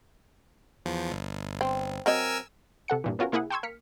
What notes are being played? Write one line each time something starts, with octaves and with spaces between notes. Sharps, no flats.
E2 F3
G1
C4
F#3 C4 A#4 D#5 G#5 E6
C3 A4 F#5 C#7
G2 A#2 E3
B3 C#4 F4 F#4 A#4
C3 A#3 E4 G#4 F#5
G5 A5 C6 C#6 E6 G#6
A#3 F6 B6 C#7